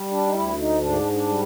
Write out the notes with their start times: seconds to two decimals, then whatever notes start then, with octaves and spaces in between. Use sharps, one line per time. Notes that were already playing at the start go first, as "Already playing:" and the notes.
Already playing: G3
0.11 D4
0.27 D#4
0.34 D2 E4
0.58 D#4
0.81 G#2 D4
1.13 D4
1.28 G3